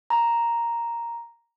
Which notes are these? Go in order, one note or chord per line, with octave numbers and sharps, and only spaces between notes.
A#5